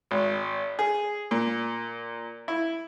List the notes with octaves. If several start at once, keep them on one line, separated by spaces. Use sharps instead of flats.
G#1
G#4
A#2
E4